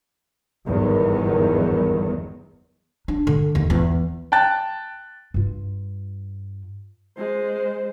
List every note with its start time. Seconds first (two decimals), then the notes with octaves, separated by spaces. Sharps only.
0.67 G1 E2 G#2 D#3 F#3
3.08 D4
3.27 D3
3.55 D#2
3.70 E2
4.32 G5 A5 F#6 A6
5.34 G2 F4
7.18 G#3 C5